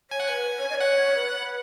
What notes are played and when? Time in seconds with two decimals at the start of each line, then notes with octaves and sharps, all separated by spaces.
0.11 C#5 G#5
0.20 F#5
0.28 B4 G#5
0.58 C#5
0.70 D#5
0.74 C#5
0.81 F#5
1.15 B4